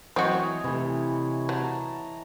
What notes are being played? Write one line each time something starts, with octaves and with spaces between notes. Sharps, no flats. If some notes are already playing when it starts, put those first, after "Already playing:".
E3 F#3 C4 F#4 C#5 D#5 G#5
C3 E3 A3
F#3 A5 A#5